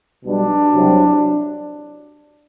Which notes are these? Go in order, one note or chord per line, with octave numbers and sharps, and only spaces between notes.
B1 B2 G3 D4
C2 C3 F#3